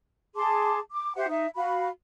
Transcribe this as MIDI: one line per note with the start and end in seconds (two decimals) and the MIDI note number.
0.36 0.79 68
0.36 0.79 81
0.36 0.79 84
0.36 0.79 86
0.92 1.16 86
1.16 1.26 67
1.16 1.26 72
1.16 1.26 76
1.16 1.26 78
1.28 1.47 63
1.28 1.47 76
1.55 1.89 66
1.55 1.89 77
1.55 1.89 83